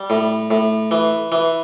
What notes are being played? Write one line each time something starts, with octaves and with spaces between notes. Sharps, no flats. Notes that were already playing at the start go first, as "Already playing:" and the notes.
Already playing: G3
A2
A2
E3
E3